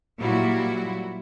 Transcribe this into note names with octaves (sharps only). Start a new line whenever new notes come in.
A#2 F#3 G3 E4 F#4